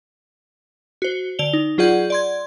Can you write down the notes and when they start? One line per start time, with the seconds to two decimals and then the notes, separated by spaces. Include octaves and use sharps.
1.02 F#4 C5
1.39 D3 D5 F7 G7
1.53 D#4
1.78 F#3 F4 G#4 D5 F#5 G6
2.10 D5 C6 G#6